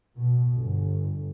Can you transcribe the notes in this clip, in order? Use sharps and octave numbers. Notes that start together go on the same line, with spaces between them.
B2
G1